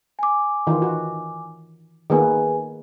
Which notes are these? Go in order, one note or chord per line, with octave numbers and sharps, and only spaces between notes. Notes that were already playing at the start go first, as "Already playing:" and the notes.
G#5 D6
D#3 E3 F4
F#4
D#3 A#3 B3 G#4 B4 G#5